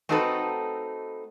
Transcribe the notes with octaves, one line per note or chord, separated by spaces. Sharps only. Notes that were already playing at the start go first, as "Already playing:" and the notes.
A3 C4 D#4 F#4 A4 B4